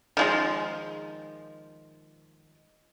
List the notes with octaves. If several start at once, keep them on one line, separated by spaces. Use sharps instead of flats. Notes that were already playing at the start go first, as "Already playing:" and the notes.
D#3 F3 G#3